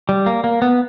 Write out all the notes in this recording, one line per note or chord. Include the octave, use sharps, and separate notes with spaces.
G3
A#3
A#3
B3